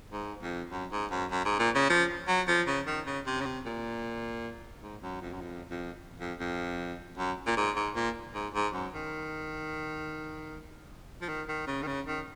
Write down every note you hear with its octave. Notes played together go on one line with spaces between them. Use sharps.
G#2
F2
F#2
G#2
F#2
F#2
G#2
A#2
C#3
F3
F#3
F3
C#3
D#3
C#3
C3
C#3
C3
A#2
G#2
F#2
F2
F#2
F2
F2
F2
F2
F#2
A#2
G#2
G#2
A#2
G#2
G#2
F#2
D#3
F3
D#3
D#3
C#3
D#3
C#3
D#3